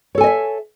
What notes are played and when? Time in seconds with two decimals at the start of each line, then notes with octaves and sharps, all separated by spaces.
0.15 C#5
0.18 A4
0.21 G#5
0.24 D#5
0.26 E5